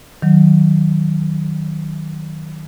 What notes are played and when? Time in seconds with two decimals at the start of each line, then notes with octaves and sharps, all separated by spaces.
0.22 D#3 F#3